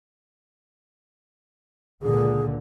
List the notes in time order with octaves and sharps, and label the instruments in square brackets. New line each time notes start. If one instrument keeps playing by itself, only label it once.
[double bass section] C#2 A#2 D3 [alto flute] G#4